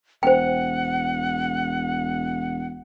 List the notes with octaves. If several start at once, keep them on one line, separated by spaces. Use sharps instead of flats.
E1 C5 F#5 G5